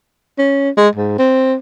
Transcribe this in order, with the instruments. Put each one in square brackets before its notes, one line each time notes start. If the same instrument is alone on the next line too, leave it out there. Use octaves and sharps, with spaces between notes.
[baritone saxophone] C#4
G#3
G#2
C4